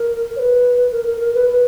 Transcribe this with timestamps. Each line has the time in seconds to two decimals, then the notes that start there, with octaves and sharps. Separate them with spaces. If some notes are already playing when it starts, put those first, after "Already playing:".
Already playing: A#4
0.36 C#5
0.39 B4
0.92 A#4
1.06 A#4
1.21 A#4
1.35 B4
1.49 B4